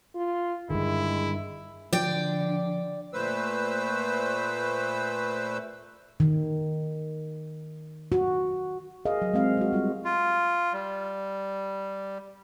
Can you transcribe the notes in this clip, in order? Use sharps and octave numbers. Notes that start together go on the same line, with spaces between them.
F4
G2 D3 D#3 G#3 E4
D3 F3 D5 G5
A#2 A3 B4 C5 E6
D#3
F#4
G#4 A#4 D#5 F5
F#3
G#3 C4 F5
G#3 F#4
G3 F4
F4
G3